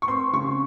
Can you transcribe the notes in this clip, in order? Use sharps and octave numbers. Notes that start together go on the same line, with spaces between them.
C#6
C4 C6
C#3 C#6